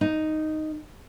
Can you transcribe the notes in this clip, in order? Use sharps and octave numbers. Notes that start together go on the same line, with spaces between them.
D#4